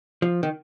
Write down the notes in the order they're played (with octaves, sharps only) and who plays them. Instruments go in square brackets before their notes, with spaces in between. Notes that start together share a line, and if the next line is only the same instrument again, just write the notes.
[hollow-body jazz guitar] F3
D#3